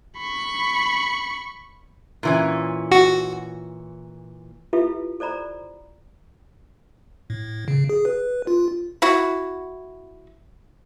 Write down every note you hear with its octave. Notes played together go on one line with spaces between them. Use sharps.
B5 C#6
A#2 E3 C#4
F#4
E4 F4 G4 A4 B4 E5
A4 C5 D5 A#5 B5
A2
C#3
G#4
B4
F4
E4 F#4